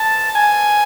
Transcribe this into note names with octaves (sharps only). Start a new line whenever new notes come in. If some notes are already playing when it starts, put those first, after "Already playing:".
Already playing: A5
G#5